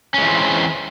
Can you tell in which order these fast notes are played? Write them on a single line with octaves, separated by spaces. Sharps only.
C#4 G#3 E3 C4